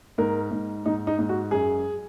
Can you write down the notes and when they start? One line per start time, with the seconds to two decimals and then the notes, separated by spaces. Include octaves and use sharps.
0.18 G#2 A#4
0.51 G#2
0.86 G#2 D#4
1.07 D#4
1.19 G#2
1.29 F#4
1.51 F#2 G#4